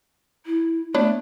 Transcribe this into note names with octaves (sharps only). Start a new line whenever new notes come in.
E4
A3 B3 D4 C#5